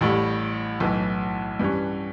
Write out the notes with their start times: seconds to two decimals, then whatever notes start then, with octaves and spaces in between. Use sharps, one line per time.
0.01 A1 A2 G3
0.80 B1 A2 E3
1.59 G2 E3 G3 C#4